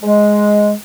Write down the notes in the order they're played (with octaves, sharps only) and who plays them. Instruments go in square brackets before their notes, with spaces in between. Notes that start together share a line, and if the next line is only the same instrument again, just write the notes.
[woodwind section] G#3